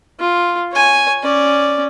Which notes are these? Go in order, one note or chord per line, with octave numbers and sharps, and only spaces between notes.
F4
C#5 G#5
C#4 D5